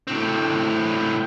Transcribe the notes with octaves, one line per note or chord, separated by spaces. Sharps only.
A2 C4